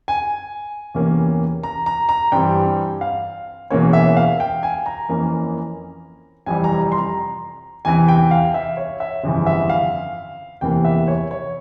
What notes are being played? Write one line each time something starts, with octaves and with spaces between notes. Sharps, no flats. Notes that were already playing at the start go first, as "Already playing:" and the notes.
G#5
E2 C3 E3 A#3 C#4
A#5
A#5
A#5
G2 E3 G3 C4 G5
F5
E1 E2 E3 A#3 C#4 C#5
E5
F5
G5
G#5
A#5
F2 E3 A#3 C#4
F1 F2 C3 E3 G3 G#5
A#5
A#5
C6
A#5
E2 C3 E3 G#5
G5
F5
E5
C#5
E5
G1 F2 C#3 E3
E5
F5
F1 E2 E3 A#3 G5
E5
C#5
C#5